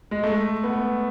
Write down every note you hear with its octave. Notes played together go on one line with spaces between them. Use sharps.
G#3
A3
B3